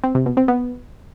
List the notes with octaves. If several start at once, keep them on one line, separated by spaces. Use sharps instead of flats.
C4
C3
B2
C4
B3